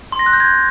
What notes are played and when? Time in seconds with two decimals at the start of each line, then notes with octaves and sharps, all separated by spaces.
0.12 C6
0.19 A#6
0.26 F#6
0.33 G6
0.40 G#6